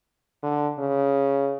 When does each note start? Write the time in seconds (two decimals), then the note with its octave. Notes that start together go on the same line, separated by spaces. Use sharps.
0.43 D3
0.79 C#3